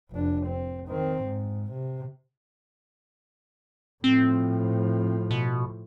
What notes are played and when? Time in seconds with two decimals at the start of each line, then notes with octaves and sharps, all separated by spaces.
0.11 F1 D4
0.47 C4
0.88 D#3 C4
1.23 G#2
1.73 C3
4.04 A2 F3 C4
5.31 B2